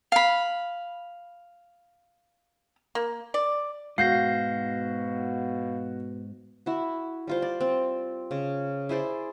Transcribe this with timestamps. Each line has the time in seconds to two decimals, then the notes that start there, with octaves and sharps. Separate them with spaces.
0.12 F5 B5
2.95 A#3
3.34 D5
3.98 G#2 B2 F#4 F5 G6 A#6 C7
6.66 E4 F#4
7.27 G3 F4 C5
7.42 D5
7.60 C4
8.31 C#3
8.89 E4 G#4 C5 D5